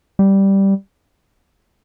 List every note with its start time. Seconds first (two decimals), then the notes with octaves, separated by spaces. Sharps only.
0.19 G3